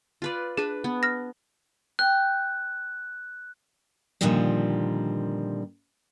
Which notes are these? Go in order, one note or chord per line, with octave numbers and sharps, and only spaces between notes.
F4 B4 D5
D4 G#4 B4
B3
F6 A#6
G5 F#6
A#2 D3 D#3 F3 G3 C4